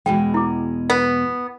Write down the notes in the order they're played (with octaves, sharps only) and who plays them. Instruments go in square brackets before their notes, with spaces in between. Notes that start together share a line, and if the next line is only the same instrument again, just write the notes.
[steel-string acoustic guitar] E2 B2 G#3 [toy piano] G5
[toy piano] E4 D6
[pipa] B3